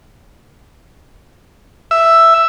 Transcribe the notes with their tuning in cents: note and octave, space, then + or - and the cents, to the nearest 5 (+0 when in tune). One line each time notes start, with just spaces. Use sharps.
E5 +5